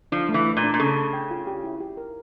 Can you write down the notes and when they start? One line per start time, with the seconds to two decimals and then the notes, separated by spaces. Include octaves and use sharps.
0.12 F3 D4
0.29 A3
0.34 E3
0.46 A3
0.57 A#2
0.63 D4
0.74 A#2
0.80 C#3 A4
0.97 A4
1.13 G5
1.31 F4
1.47 G4
1.64 E4
1.80 G4
1.97 A#4